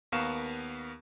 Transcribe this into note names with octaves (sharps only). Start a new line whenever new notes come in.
D#2 B3 A#4 F5 C#6 E7